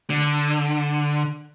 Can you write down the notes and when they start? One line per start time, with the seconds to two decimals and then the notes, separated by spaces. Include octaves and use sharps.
0.10 D3